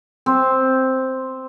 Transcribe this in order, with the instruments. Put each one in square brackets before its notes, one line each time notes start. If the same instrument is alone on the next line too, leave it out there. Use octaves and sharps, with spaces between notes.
[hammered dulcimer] C4